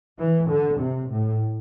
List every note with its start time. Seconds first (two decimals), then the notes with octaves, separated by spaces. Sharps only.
0.18 E3
0.49 D3
0.79 C3
1.10 A2